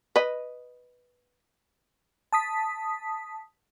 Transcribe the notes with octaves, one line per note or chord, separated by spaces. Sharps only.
B4 D#5
A5 D#6 B6